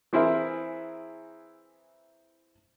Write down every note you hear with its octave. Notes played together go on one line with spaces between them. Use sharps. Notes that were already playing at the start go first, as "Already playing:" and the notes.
E3 C4 E4 G#4 A#4 E5